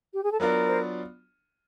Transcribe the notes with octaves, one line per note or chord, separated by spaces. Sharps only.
G4
G#4
A4
F#3 B3 D4 F4 A#4
C5